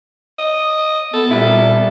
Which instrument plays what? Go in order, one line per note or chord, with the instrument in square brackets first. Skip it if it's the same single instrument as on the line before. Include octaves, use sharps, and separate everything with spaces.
[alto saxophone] D#5
[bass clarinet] B3 [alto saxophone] A4
[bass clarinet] A#2 [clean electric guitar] G3 E4